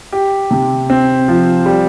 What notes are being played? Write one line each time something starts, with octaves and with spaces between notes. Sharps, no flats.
G4
C3
C4
F3
G3